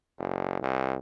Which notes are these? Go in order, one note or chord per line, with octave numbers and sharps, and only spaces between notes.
F#1
C2